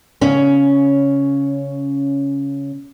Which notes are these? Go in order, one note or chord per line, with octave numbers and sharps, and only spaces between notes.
C#3 C#4 C#5